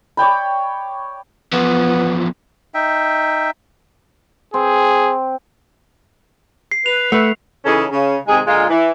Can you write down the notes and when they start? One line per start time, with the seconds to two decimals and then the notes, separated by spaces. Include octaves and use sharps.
0.17 C#5 D5 G5 B5
1.53 E2 F3 B3
2.74 D#4 E5 G5
4.54 C4 G#4
6.72 C7
6.86 B4 F7
7.12 A3 B4 E5 F#5
7.66 C#3 E3 C#4 D#4 G#4 A4
7.90 C#3
8.28 C3 D#3 G#3 D#4 G#4
8.47 A#2 D3 G#3 F4
8.69 E3